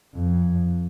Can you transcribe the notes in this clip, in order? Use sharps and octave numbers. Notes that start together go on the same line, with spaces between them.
F2